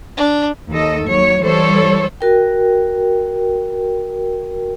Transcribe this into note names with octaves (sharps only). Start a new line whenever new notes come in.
D4
D#2 D#3 A4 D#5
D#2 F#3 C#5
E3 G3 A4 C5 C#5
F#4 A#4 G5